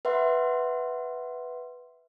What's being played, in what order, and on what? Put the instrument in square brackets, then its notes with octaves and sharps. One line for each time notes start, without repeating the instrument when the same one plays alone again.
[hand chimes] B4 E5 F#5 C6